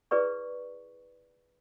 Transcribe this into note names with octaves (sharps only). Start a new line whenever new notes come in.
E4 G#4 B4 D5 C#6